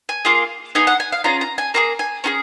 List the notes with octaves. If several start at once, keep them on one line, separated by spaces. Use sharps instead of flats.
G#5
A#3 F4 G#4
B3 D#4 G#4 G#5
F#5
G#5
F5
C#4 F4 G#4 A#5
A#5
G#5
A#3 F4 G#4 A#5
G#5
C#4 F4 G#4 A#5